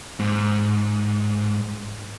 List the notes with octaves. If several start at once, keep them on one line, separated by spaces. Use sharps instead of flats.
G#2